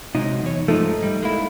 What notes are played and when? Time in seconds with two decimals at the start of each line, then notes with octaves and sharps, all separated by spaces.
0.15 C3 F#3 G#3 D#4
0.44 E2 C#5
0.68 G#2 F3 A3 D#4
1.03 G3
1.22 G#3 A#3 E4